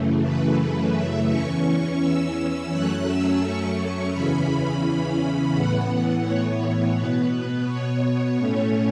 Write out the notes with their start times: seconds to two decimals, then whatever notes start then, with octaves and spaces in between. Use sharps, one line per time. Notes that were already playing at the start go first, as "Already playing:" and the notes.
Already playing: F#2 C#3 E3 A3
0.22 B4
0.57 B4
0.93 E5
1.28 E2 E3 C#4 C#6
1.99 E6
2.70 F#2 F#3 A3 C#4 F#6
3.05 E6
3.41 C#6
4.12 E2 C#3 E3 C#4 B5
5.54 A2 E3 B3 F#5
6.25 C#5
6.95 B2 B3 B4
7.31 B4
7.66 C#5
8.37 A2 A3 C#4